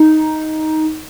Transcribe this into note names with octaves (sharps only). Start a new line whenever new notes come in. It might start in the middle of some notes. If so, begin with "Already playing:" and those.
Already playing: D#4